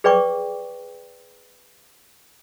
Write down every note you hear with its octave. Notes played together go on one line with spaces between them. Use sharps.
G#4 B4 D5 G5 C#6 D6